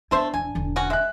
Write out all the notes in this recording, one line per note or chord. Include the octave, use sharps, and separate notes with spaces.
A3 B3 D4 E4 C5 E5
E1 G#5
E1 D3
C#4 F#4
G#3 E5 F#6